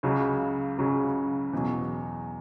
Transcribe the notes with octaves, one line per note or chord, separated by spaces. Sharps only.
C#2 C#3 F#3
C#2 C#3 F#3
E2 B2 F#3